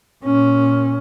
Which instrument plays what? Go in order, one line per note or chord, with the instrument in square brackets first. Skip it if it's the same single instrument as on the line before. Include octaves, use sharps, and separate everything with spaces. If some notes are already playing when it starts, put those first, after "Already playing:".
[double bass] A#2 C#4